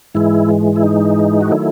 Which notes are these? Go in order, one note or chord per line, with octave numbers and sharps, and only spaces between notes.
G#2 E3 G#3 E4
E4
D#4
F#4
D#3 F#3 A3 E4